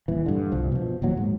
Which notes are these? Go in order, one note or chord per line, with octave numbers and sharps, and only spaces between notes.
D#1 E3
G2 D3
G1 C2 F3
B2 F3
D#1 D#2 F#3
G#2